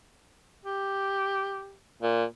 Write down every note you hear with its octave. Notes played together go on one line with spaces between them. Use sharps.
G4
A#2